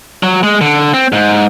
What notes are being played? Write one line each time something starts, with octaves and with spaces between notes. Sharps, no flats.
F#3
G#3
D3
C4
G#2